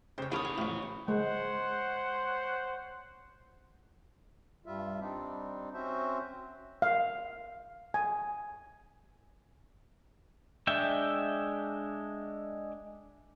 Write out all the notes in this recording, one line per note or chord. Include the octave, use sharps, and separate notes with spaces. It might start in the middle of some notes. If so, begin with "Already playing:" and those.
C#3 G4 C5 C#5
D#2 E3 A#4 B4 C#5 A5 D#6
G#4
F2 A2
G#3 C5 C#5 F#5
G2 G3 F4 E5
G3 C4 D4 D#4
C4 C#4 F#4 C5 E5
F5
G#5
G#3 D4 E5 G5